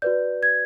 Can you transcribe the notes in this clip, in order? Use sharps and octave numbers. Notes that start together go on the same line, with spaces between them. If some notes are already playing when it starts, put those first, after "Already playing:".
F#4 B4 D5 G6
G#6